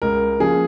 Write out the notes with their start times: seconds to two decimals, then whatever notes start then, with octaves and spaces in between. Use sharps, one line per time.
0.02 C#2 A#4
0.39 C#3 F3 A#3 G#4